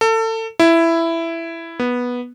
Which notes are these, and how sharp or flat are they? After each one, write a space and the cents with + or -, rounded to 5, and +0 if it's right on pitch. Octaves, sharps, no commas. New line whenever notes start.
A4 +30
E4 +10
B3 -10